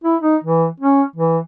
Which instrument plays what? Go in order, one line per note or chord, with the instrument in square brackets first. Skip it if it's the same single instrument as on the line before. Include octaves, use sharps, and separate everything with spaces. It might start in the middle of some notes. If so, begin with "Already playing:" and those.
[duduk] E4
D#4
E3
C#4
E3